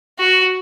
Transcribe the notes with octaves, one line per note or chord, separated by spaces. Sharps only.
F#4